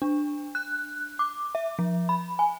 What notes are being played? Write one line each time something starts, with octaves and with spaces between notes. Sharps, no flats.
D4
F#6
D6
E5
F3
B5
G#5